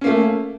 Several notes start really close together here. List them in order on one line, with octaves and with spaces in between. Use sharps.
C#4 A#3 A3